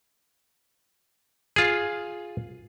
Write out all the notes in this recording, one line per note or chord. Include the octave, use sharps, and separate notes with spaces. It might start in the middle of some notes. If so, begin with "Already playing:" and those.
F4 G#4